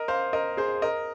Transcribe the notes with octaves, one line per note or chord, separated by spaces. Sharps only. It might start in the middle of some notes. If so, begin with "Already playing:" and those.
Already playing: A#4 D#5
C5 F5
A#4 D#5
G#4 C5
A#4 D#5